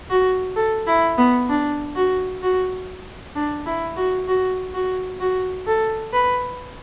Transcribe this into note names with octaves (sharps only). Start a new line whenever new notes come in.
F#4
A4
E4
B3
D4
F#4
F#4
D4
E4
F#4
F#4
F#4
F#4
A4
B4